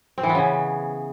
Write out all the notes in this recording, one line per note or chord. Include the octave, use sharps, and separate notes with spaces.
C4
E3
B3
C#3